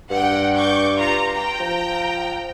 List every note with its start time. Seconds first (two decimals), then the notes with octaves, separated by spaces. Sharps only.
0.11 G2 F#5 G5
0.56 C#6 D6 G6
0.95 F4 A#5
1.30 G5 A#5
1.60 F3